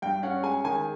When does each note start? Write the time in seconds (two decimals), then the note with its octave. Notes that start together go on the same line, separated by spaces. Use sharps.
0.02 G2 G5
0.23 C#4 F#5
0.43 G#3 G#5
0.64 D#3 G#5